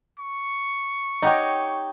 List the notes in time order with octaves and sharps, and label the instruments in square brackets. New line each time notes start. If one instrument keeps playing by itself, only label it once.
[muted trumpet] C#6
[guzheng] D#4 G4 C#5 [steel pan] D#5 F#5 G5